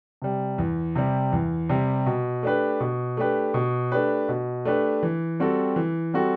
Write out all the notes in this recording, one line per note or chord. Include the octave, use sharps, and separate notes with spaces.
C3 G3
E2
C3 G3
E2
C3 G3
B2
A3 D4 G4 B4
B2
A3 D4 G4 B4
B2
A3 D4 G4 B4
B2
A3 D4 G4 B4
E3
G3 C4 F#4 A4
E3
G3 C4 F#4 A4